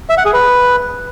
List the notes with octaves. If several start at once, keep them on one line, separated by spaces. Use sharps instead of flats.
E5
F#5
G#4
B4